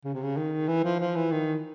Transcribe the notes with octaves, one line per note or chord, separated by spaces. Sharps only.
C#3
C3
C#3
D#3
E3
F3
F3
E3
D#3